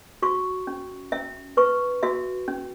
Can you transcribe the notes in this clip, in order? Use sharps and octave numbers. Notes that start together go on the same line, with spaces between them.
F#4 C#6
C#4
C#4 E5
B4 C#6
F#4 E5
C#4